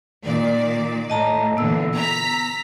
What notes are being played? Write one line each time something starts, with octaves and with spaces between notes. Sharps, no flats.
A#2 D#3 D5
A2 D#5 A5 A#5
A#2 D3 E3 B3 E6
A#5 B6